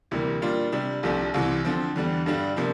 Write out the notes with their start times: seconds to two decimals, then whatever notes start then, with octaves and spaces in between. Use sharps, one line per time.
0.11 D2 C3 E3 G3 A#3
0.42 A#2 G3 D4 F4
0.72 C3 G3 D4
1.03 C2 C3 F3 A3 D4
1.34 C2 C3 E3
1.65 D3 F3 C4
1.96 E2 D3 G3
2.26 G2 D3 G3 D4
2.56 C3 F3 A#3 D4